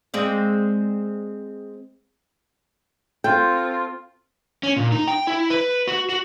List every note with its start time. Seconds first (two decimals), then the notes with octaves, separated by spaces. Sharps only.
0.14 G#3 C4 D5
3.24 C4 F4 A4 G5
4.63 C#4
4.76 A#2
4.92 D#4
5.07 G5
5.27 E4
5.50 B4
5.87 F#4
6.09 F#4